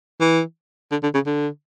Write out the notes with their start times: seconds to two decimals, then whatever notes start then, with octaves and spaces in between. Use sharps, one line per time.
0.20 E3
0.91 D3
1.03 D3
1.14 C#3
1.26 D3